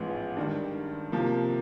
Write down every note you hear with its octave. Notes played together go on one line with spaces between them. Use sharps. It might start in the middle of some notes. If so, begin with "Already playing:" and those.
Already playing: A1 G#2 F3 G#3 B3
G2 D#3 G3
C3 F3 A#3